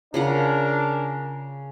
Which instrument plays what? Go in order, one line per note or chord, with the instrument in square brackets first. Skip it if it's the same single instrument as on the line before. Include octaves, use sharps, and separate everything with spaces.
[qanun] C#3 F4 F#5 [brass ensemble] D4 A#4